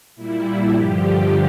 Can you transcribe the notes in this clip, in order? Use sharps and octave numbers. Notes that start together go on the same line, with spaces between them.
A#2 G3 E4
G2 D3 F3 G4